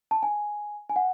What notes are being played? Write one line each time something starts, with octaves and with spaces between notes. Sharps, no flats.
A5
G#5
G#5
F#5